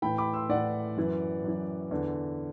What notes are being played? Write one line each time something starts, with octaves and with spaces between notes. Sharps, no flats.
A2 E3 G5 B5
B5 D6
C6 E6
A2 E3 D5 F#5
F#2 E3
F#2 E3
E2 D3